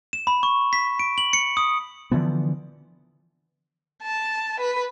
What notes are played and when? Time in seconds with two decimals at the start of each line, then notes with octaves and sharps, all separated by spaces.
0.13 E7
0.27 B5
0.43 C#6
0.73 B6
0.99 D7
1.18 F#7
1.33 C#7
1.57 D#6
2.11 D3 E3 F3 B3
4.03 A5
4.60 B4